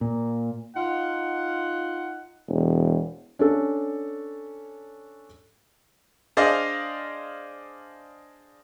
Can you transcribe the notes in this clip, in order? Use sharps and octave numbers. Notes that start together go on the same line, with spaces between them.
A#2
D#4 F4 F#5
E1
C#4 D4 A4
D4 G#4 C5 D5 D#5 F5